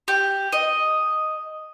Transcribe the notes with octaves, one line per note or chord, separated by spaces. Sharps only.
G4
D#5